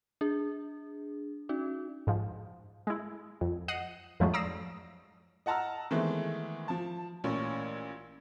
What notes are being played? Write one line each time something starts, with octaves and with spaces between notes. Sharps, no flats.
D4 G#4
C#4 D#4 F#4
G#2 F3
G#3 E4
F2
D#5 F#5 C7 D#7
F2 A2 F3 F#3 G#3 C#4
D5 A#5 D#6 E6 A#6 C7
D#5 F#5 A5 A#5 E6 F6
D#3 E3 G#3 A3 B3 C4
F3 A5
A1 A#2 C#4